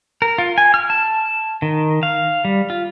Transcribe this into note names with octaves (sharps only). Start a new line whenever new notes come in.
A#4
F4
G#5
F6
A5
D#3
F5
G3
F4